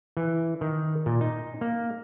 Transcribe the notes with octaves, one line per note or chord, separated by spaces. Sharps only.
E3
D#3
A#2
D#4
A#3